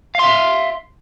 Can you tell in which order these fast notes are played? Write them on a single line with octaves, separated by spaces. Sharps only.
F5 C6 E5